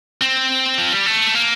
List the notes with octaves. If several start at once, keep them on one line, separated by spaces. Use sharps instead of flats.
C4
F3
G3
A3
A#3